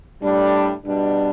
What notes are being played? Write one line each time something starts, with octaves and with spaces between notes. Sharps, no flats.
A2 G3 D4
B2 G3 D4